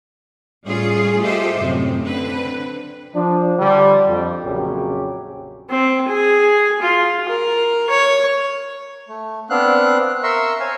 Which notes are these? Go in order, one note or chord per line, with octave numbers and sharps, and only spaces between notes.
A2 G3 C#4 F4 G#4
F4 G4 A4 C5 D#5 E5
F#2 A2 C3
D3 C4 B4
F3 D4
D3 G3
F2
A#1 F2 C#3 F#3 G4
C4
G#4
F4
A#4
C#5
A3
B3 C4 D4 F5 F#6
A#4 E5 A#5 C6 C#6 E6
C5 C#5 F5 G#5